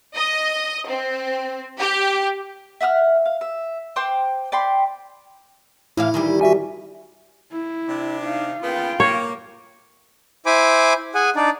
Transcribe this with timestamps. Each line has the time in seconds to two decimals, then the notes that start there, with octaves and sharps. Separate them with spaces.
0.15 D#5
0.88 C4
1.79 G4
2.81 E5 F#5 D#6 F6
3.25 F5
3.41 E5
3.96 C5 G5 C6 D6
4.52 D5 G5 B5 C6
5.97 A2 E3 E4 F5
6.14 D#3 E3 G3
6.41 F#4 E5 G#5
7.52 E4
7.89 C3 D4
8.23 D#4 F5
8.62 C#3 A#3 B3 F4 G5
9.00 A#3 C#5
10.46 E4 C5 G#5 B5 D6
11.15 G#4 F#5 G#5
11.36 D4 D#4 D5